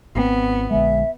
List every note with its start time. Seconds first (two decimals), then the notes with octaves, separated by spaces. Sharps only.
0.15 G#1 B2 B3 C4
0.71 A#1 D3 G#3 E5